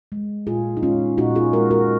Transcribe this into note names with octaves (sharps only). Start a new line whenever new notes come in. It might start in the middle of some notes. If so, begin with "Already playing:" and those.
G#3
A#2 F4 G#4
D#4
G#3 C#4 F4
A#2 D#4 F#4
F4 G#4
G#3 F#4 A#4
F#4 A#4